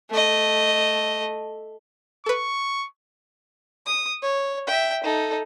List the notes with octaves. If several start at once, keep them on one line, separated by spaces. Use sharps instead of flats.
A3 D#5
A4 B4 C#6
D#6
C#5
E5 G5
D#4 A4